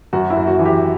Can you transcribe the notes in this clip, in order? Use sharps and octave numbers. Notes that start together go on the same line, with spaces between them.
F#2 F#4
E4
F#2
F#4
E3
G4